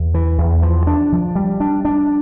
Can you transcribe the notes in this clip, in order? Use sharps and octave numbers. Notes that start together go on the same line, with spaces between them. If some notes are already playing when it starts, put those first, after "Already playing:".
Already playing: E2
E3
E2
F3
D4
F3
G3
D4
D4